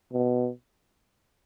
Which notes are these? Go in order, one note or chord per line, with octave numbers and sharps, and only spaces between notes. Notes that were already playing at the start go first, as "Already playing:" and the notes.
B2